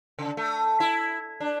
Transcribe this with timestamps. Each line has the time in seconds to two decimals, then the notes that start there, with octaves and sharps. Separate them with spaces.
0.19 C#3
0.37 A3
0.80 E4
1.40 D4